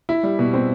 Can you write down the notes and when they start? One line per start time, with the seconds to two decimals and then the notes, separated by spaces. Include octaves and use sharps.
0.09 E4
0.23 G3
0.39 B2
0.54 C4